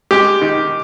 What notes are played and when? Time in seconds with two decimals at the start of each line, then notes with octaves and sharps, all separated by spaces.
0.11 G#3 G4
0.42 D#3